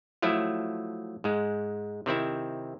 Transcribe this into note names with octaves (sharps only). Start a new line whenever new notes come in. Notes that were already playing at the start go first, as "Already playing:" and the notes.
F3 F#3 A3 E4
G#2 G#3
C3 D#3 C4 E4